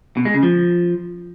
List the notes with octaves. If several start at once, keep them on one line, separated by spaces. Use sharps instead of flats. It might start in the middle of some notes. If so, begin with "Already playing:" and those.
B2
G#3
C#3
F3